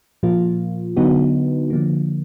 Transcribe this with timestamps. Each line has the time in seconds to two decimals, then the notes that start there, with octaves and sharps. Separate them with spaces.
0.23 A#2 F3 A#3 F4
0.96 D3 F#3 B3 D#4 F#4
1.70 D3 F3 A#3